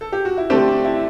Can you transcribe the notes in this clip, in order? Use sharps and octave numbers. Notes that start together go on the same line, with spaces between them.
A4
G4
F#4
E4
D3 A3 C4 D4 G4
D4
E4